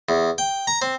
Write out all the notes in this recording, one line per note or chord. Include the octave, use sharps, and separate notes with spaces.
E2
G5
A#5
C4